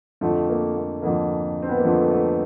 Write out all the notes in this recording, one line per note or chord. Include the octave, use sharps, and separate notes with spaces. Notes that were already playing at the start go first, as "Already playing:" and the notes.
F2 D3 F3 A3
A#3
A#3
F2 D3 F3 A#3
C4
B3
A#3
F2 D3 F3 A3
A3